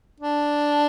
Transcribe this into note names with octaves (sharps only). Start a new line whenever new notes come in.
D4